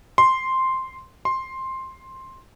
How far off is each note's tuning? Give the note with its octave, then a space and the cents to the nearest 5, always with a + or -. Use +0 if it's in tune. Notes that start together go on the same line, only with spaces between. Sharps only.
C6 +0
C6 +10